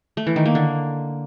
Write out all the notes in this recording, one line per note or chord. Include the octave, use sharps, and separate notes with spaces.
A3
E3
D#3
A#3
D3